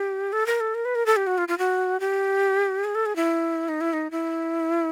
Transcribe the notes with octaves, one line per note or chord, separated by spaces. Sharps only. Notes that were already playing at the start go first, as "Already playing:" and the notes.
Already playing: G4
A4
A#4
A4
A#4
B4
A#4
A4
G4
F#4
F4
F4
F#4
G4
G#4
A4
G#4
E4
D#4
E4
D#4
E4